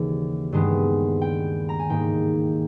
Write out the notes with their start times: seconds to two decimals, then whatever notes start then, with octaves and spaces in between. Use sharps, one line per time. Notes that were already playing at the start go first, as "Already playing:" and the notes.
Already playing: D#2 C#3 E3 G3
0.52 G2 D#3 G#3 B3
1.21 G5
1.69 A#5
1.79 G#5
1.90 G#2 D#3 A#3 G5